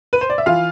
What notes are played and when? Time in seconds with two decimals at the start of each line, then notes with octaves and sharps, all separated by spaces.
0.13 B4
0.21 C5
0.30 D5
0.38 E5
0.46 E3 F4 F5